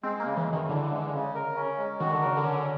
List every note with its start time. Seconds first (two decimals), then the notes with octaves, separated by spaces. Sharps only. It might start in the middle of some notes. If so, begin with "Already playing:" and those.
0.03 G#3 C4
0.20 A#3
0.26 C#3
0.37 E3
0.47 F#2
0.53 D#3
0.69 D3 E3
0.91 G#3
1.13 C#3
1.35 A#4
1.56 C#4
1.78 G#3
2.00 D#3 F#4
2.12 D3
2.21 C#3 A#4
2.37 D3
2.43 C#4